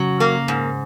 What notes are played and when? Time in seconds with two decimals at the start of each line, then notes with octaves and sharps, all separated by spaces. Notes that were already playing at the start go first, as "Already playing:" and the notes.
Already playing: C#3 F#3 C#4
0.20 A#3
0.48 G#2